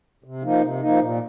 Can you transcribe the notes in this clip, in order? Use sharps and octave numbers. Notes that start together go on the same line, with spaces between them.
C3
F3 A#3 D#4
C3
F3 A#3 D#4
A#2